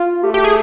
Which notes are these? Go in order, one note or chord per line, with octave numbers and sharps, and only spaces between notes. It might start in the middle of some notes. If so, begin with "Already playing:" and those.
Already playing: F4
A3 G4
G4
G#4